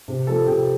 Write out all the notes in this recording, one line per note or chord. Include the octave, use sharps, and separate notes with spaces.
C3
F3 A#3 A4 A5
C3 G4 G5